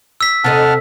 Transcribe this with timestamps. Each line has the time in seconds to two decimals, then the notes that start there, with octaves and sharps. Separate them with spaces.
0.21 E6 B6
0.44 C3 A4 D#5 F#5 A5 F6